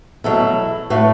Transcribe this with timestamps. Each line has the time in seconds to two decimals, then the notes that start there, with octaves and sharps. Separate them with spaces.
0.24 E2 B2 F#3 A3 E4 A4
0.90 A2 A3 F#4 B4